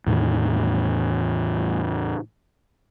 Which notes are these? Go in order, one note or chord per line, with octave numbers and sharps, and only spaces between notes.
E2 A2 D#3 E3